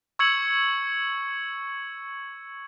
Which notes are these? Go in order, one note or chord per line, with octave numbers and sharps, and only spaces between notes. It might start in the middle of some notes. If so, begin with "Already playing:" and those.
C#6 E6 G#6 C#7 F#7